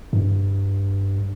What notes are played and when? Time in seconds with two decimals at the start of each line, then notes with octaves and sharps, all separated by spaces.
0.13 G2